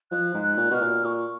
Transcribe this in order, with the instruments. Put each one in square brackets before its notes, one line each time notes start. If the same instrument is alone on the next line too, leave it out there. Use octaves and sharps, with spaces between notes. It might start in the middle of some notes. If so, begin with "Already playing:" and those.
[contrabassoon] F3 [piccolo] F#6
[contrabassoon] G#2
[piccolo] F#6
[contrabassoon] A#2
[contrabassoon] B2 [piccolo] F6
[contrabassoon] A#2
[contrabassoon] A#2 [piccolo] C#6